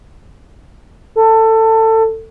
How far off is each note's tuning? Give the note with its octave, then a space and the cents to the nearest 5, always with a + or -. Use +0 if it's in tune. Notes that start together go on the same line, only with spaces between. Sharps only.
A4 +20